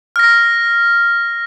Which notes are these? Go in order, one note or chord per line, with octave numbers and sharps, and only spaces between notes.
F6 A#6